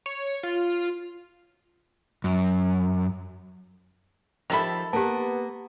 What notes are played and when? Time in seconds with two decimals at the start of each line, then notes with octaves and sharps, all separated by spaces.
0.06 C#5
0.43 F4
2.24 F#2
4.50 D#3 F3 G4 A4 E5 B5
4.93 A#3 B3 G4 B4 A5